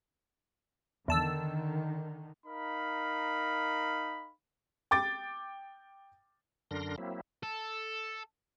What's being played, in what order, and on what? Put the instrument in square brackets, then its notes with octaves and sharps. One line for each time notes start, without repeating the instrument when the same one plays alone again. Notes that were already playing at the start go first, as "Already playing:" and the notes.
[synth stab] E2 A5 E6 [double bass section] D3 D#3
[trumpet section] D#4 A#4 F5 B5
[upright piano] G5 D6 A6
[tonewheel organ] F#2 D3 D4 A#4 C6 A#6
F#3 A#3 C4 E4
[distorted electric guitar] A4